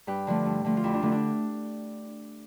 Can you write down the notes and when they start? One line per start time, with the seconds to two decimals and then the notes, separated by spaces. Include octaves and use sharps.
0.07 G2 G4 B4
0.27 D3 F3 A3
0.46 G2
0.65 D3 F3 A3
0.77 F4
0.84 F2 E4 G4
0.93 D4 F4
1.02 D3 A3 E4
1.12 D4